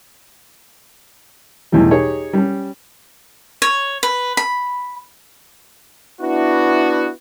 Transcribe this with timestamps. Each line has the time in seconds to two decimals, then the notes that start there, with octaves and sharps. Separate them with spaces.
1.72 B1 E2 A2 E3 G3
1.91 D#4 G4 G#4 C#5
2.33 G3 C#4
3.62 C#5
4.03 B4
4.37 B5
6.20 B3 D4 E4 F#4